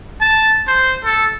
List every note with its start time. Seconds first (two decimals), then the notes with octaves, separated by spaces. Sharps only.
0.21 A5
0.68 C5
1.05 A4